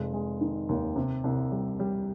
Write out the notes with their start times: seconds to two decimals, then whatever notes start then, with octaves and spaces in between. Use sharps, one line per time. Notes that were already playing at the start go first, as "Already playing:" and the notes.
Already playing: F1 G#3
0.14 G#3
0.41 D#3
0.69 D#2
0.96 C3
1.24 C2
1.52 G3
1.79 G3